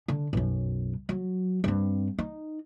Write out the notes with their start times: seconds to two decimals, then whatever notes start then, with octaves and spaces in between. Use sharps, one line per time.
0.08 D3
0.33 B1 F#2
1.09 F#3
1.64 G2 C4
2.18 D#4